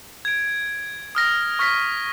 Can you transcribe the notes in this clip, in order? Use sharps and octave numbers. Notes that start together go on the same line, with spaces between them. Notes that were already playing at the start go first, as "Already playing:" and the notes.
G#6 D7
D#6 F6 A#6
C#6 F6 A#6 B6